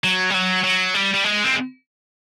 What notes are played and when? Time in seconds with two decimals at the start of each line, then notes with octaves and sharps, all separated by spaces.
0.04 F#3
0.30 G3
0.34 F#3
0.64 F#3
0.95 G3
1.14 G3
1.24 G#3
1.44 C4